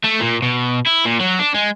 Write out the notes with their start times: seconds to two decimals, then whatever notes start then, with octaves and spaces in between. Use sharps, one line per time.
0.04 A3
0.20 A#2
0.43 B2
0.87 E4
1.06 A#2
1.20 F#3
1.40 D4
1.55 G#3